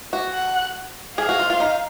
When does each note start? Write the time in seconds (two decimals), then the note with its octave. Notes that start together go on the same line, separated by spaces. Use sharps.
0.13 F#4
0.34 F#5
1.18 G#4 F5
1.29 F#4
1.39 F4
1.50 F4
1.60 D#4